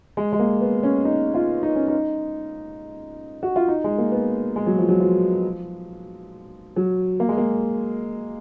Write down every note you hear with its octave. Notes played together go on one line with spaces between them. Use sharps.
G#3
G#3
A#3
B3
C#4
D#4
F4
D#4
C#4
D#4
F#4
F4
D#4
G#3
A#3
B3
G#3
F#3
F3
F#3
F3
F#3
A#3
G#3
A#3